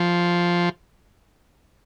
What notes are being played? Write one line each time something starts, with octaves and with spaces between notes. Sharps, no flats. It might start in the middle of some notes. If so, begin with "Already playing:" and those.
Already playing: F3